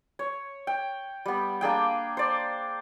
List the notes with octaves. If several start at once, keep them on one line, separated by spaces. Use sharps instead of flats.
C#5
G5
G3 B3
A#3 D4 G#4 G5
C5 D5